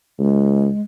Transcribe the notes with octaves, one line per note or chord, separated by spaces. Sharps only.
C#2 G#3